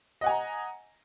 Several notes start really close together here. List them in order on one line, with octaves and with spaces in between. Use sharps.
D#5 F#5 G#5 A#5